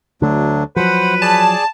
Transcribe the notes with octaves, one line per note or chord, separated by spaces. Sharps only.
D2 D3 F#3 A3 D4
F3 F#3 B4 C5 F#5 B5
G#4 D5 G#5 A5